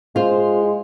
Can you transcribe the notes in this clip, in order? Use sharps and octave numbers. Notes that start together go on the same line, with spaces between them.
G#3 F4 C5